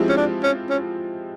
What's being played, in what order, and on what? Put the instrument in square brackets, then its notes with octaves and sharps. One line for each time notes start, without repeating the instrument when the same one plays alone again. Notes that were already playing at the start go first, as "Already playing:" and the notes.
Already playing: [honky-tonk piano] F3 G#3 C4 E4 G4
[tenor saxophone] C#4
D4
C#4
C#4